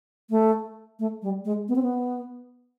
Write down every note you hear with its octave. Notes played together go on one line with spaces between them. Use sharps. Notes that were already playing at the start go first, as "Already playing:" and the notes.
A3
A3
G3
G#3
B3
C4
B3